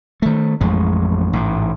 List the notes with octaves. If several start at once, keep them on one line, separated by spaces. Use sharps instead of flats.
D#3 A3
A1 F2 G#3
A1 G#2